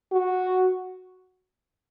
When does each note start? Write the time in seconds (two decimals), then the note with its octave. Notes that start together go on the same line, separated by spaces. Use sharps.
0.12 F#4